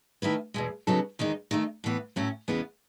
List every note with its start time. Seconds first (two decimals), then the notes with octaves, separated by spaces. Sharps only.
0.22 D#3 A3 E4 B4
0.54 E2 B2 G#3
0.87 C#3 F#3 B3 D#4 A4
1.19 E2 D#3 G#3 D#4
1.51 D#3 A3 D#4
1.84 A2 E3 B3
2.16 A2 F#3 A3 C#4
2.48 E2 C#3 E3 G#3 B3